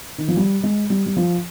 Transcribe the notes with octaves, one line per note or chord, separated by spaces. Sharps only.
D#3
F3
G3
G#3
G3
G3
F3